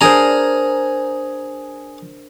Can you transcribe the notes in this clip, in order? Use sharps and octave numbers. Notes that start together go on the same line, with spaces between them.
D4 G#4 A#4 C5 A#5